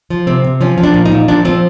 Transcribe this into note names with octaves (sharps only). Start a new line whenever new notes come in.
F3
C3 C4
C3
F3 C#4
F3
D4
A#2
D#4
A#2
F3 D4
F3 C4